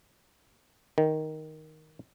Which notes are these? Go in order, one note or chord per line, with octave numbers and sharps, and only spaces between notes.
D#3